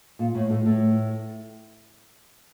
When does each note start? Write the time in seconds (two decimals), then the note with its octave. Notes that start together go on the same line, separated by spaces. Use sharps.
0.19 A#2
0.35 A2
0.50 A2
0.65 A2